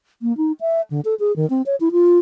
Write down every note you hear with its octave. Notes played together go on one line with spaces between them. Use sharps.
A#3
D#4
E5
D3
A4
G#4
D#3
C4
C#5
E4
F4